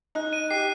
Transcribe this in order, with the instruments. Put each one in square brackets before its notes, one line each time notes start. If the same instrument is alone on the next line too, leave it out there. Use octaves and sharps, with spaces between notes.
[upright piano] D#4 [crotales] F#6
[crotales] D#7
[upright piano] G4 [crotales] C7